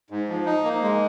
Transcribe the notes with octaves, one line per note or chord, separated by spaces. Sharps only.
G#2
F3
D#4
A#3
G#3